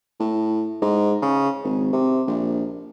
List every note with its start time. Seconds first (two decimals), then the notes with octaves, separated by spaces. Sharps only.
0.20 A2
0.82 G#2
1.22 C#3
1.64 G#1
1.93 C3
2.27 A#1